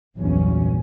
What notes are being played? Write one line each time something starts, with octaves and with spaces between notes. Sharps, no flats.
A#1 E2 G2 F#3 C#4